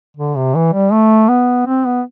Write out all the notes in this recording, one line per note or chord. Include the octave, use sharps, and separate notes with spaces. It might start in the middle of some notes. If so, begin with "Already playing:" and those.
D3
C3
E3
G3
A3
B3
C4
B3